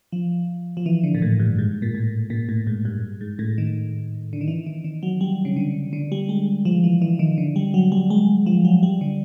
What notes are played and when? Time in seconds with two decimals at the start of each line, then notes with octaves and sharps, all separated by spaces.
0.12 F3
0.77 F3
0.86 E3
1.03 D3
1.15 A#2
1.22 A2
1.39 G2
1.58 G#2
1.82 A#2
1.94 A2
2.30 A#2
2.49 A2
2.67 G#2
2.85 G2
3.21 G#2
3.39 A2
3.58 D#3
4.33 D3
4.41 D#3
4.48 E3
4.67 D#3
4.84 D#3
5.03 F#3
5.21 G3
5.45 C#3
5.56 D3
5.93 D3
6.12 G3
6.29 G#3
6.65 F3
6.84 E3
7.02 E3
7.19 D#3
7.38 D3
7.56 G3
7.74 F#3
7.92 G3
8.10 G#3
8.46 F3
8.65 F#3
8.83 G3
9.01 D3